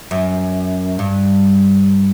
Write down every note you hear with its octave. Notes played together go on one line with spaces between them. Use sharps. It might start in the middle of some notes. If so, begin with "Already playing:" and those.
F#2
G2